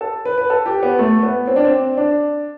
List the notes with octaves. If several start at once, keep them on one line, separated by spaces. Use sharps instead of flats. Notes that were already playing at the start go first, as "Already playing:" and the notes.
A4
B4
B4
A4
G4
B3
A3
B3
C4
D4
C4
D4